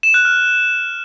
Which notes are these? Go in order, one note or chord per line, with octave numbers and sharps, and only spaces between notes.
E7
F#6
F6